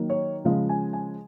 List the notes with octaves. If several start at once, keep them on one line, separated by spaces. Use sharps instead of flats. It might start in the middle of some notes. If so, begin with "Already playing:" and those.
Already playing: D#3 F#3 A#3
C#5
C#3 F3 G#3 F5
G#5
G#5